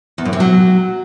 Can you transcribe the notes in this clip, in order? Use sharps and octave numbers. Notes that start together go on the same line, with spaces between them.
E2
F#2
C3
F#3